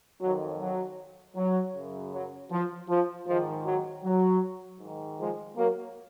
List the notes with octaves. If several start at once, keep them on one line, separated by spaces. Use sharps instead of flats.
F2 D#3 F#3
F#3
F#3
F#2 C#3
F#3
F3
F3
G#2 D#3 F3
F#3
F#3
G#2 D#3
F3 G#3
F#3 A#3